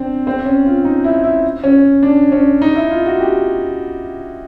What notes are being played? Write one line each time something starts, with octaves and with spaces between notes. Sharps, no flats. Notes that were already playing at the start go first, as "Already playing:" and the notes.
Already playing: C4 D4
C4
C#4
F4
D#4
E4
E4
C#4
D4
C#4
D#4
E4
F4
F#4
G4